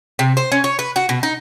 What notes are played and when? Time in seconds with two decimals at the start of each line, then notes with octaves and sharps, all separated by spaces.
0.19 C3
0.37 C5
0.52 C#4
0.64 C#5
0.79 B4
0.96 F#4
1.09 B2
1.23 D#4